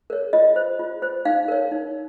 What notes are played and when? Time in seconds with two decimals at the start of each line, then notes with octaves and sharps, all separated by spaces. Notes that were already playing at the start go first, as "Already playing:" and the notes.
0.10 A#4 C#5
0.33 F4 D#5
0.56 C5
0.79 F4
1.02 C5
1.25 D#4 F5
1.48 A#4 C#5
1.71 D#4